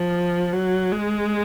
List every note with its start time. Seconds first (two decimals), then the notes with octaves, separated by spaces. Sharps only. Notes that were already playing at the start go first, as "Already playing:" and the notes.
Already playing: F3
0.53 F#3
0.92 G#3